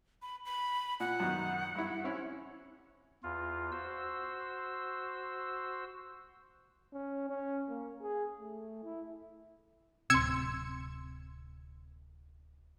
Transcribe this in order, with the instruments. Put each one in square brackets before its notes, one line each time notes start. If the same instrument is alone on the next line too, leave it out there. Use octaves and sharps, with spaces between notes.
[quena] B5
B5
[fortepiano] A#2 [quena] F#5
[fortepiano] F#2 B2 D#3
G2 E4
C4 C#4 E4
[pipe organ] E2 F4
F#4 C5 E6
[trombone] C#4
C#4
A#3
G#4
A3
E4
[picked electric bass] D1 C3 [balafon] C4 C6 [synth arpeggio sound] E6 G#6 C#7